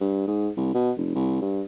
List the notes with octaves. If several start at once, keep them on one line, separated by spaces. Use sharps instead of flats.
G2
G#2
C2
B2
F1
C2
G2